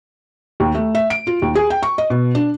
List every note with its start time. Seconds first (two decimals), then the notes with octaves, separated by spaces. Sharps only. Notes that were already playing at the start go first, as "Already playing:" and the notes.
0.60 D#2
0.75 A3
0.95 E5
1.10 D7
1.27 F4
1.42 D#2
1.55 G#4
1.70 G5
1.83 C#6
1.98 D#5
2.10 B2
2.35 D4